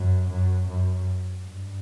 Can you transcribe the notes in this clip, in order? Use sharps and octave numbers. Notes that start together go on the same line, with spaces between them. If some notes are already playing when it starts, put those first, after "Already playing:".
Already playing: F#2
F#2
F#2
G2